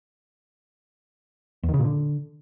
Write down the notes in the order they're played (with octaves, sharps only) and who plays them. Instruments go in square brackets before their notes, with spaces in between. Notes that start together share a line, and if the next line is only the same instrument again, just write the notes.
[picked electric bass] E2
D#3
C#3
A#2
D3